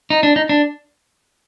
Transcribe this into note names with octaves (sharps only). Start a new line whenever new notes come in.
D#4
D4
D#4
D4